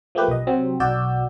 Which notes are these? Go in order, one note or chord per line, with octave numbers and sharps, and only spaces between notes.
F3 A3 A#3 G4 B4
B1 D#5
C3 F#3 C4
B1 F#4 D5 E6 G6